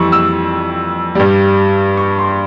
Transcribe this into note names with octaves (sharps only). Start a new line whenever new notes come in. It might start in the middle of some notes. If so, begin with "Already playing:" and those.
Already playing: F2 E3 G3 C#6 E6
E6
G2 G3
C#6
C6